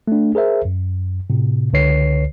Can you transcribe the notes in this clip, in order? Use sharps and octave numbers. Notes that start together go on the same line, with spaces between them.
A3 D4
G#4 A#4 C5 E5
F#2
A2 C3
C#2 D3 B4 C#5 C7